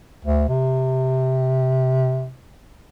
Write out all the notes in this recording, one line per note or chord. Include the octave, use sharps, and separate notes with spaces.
D2
C3